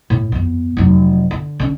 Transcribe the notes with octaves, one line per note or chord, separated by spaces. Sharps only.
A2
F2 B3
F1 F#3
D3
D3 C#4